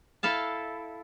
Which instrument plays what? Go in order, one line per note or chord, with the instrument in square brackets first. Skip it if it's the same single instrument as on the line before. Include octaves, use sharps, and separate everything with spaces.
[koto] E4 A4 F5 A5